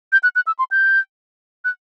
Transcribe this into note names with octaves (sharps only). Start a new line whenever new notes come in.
G6
F#6
F#6
E6
C6
G6
F#6